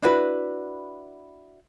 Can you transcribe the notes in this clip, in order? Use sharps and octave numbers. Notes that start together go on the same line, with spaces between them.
D4 E4 F#4 B4